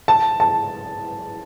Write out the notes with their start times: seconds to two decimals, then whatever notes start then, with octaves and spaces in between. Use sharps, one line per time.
0.08 A5
0.40 A5